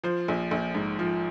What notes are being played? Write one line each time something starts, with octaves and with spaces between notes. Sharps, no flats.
F3 C5
A#1
A#1
G#2
F3